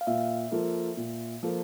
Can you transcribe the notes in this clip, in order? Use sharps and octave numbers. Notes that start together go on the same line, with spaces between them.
F5
A#2 E5
F3 A#3 F4 A4
A#2
F3 A#3 F4 A4